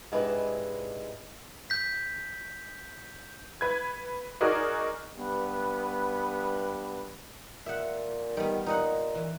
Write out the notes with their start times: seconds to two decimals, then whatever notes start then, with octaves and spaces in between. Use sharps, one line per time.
0.12 G#2 C3 G#3 D4 E4 B4
1.70 G6 B6
3.61 B4 G#6
4.41 D#4 F#4 G#4 A#4 D5
5.16 G2 B3
7.66 A#2 E5 F#5
8.37 D#3 G3 B3
8.66 A#2 D#4 D#5 F#5
9.15 E3